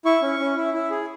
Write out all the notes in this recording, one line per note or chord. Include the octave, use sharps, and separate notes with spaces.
E4 C#6
C#4
C#4
E4
E4
G#4